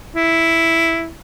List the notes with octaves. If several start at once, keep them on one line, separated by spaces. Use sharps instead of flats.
E4